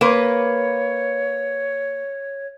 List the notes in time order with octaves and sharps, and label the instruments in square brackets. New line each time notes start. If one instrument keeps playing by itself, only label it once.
[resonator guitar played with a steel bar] A#3 B4 [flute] C#5